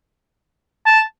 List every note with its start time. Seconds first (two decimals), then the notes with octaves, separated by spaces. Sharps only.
0.86 A5